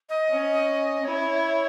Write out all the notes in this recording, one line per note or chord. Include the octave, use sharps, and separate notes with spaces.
D#5
C#4
E4 C#5